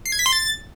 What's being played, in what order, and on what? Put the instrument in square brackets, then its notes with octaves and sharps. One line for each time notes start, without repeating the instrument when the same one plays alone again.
[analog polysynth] C7
G#6
B6
C6
A6